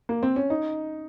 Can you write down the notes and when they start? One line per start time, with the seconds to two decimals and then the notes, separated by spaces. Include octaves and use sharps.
0.09 A#3
0.23 C4
0.36 C#4
0.50 D#4